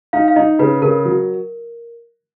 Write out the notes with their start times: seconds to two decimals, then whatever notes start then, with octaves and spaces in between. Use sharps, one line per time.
0.13 D#4 F5
0.28 F5
0.36 D#4 D#5
0.59 C#3 B4
0.82 C#3 A#4
1.05 F#3